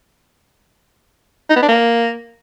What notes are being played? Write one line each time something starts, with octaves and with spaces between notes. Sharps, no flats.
D#4
B3
D4
A#3